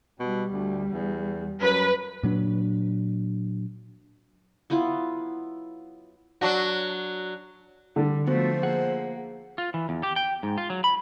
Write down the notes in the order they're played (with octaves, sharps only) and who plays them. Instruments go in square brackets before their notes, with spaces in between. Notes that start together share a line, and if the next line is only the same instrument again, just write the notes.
[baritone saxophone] B2 [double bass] G3
[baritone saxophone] D2
E2
[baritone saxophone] F#2 [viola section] B4
[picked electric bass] A#2 F#3 D4
[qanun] F#3 B3 E4 F4
[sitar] F#3 D4 F#4
[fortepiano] D3 [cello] G3
[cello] F3 A3 [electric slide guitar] B3 F#4 [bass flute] C5
[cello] A#3 [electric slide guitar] G#4 F#5
[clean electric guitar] F4
E3
E2
G4
G5
G#2
F4
F#3
B5